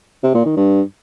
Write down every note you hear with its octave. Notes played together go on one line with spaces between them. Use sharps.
C3
A#2
D#3
G2